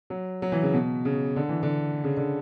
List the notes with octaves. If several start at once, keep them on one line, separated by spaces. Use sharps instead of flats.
F#3
F#3
E3
C#3
B2
C#3
D3
E3
D3
C#3
D3